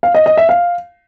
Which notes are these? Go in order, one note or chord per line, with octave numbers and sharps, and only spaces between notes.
F5
D#5
D#5
E5
F5